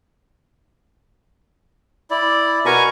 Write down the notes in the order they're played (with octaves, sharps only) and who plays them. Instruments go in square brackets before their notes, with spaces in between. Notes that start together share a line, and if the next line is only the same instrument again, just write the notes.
[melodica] E4 D5
[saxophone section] B2 F#4 A#4 [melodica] G#5 A#5 C#6